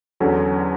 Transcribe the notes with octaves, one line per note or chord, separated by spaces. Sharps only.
E2 D3 F#3 C#4